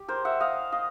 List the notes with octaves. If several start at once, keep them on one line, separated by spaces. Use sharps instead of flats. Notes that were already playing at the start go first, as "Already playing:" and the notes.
Already playing: G4
A#4 C5
E5 F#5
D#5 F5
D#5 F5